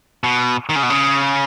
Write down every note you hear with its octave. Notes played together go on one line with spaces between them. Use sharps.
B2
D#3
C#3
B2
C#3